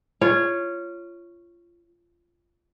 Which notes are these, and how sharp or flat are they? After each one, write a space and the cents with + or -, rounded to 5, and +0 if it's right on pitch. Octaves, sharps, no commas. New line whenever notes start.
F4 -20 C#5 +0